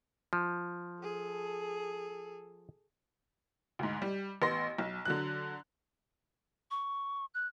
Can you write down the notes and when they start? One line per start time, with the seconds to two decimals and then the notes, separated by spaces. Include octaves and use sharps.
0.33 F3
1.01 G#4 A4
3.79 D2 G#2
4.02 G3
4.42 A1 B3 C6 A#6
4.78 B1
5.05 D3 F#3 F#6
6.71 C#6
7.34 F#6